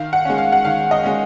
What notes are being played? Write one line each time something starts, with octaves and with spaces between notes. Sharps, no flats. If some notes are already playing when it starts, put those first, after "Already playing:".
Already playing: D#3 F5
F#5
G#3 C#4
F5
F#5
D#3 F5
D#5
G#3 C#4